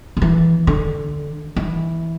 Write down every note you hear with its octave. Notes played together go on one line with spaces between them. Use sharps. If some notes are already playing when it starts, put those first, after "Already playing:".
D3
E3
D3
E3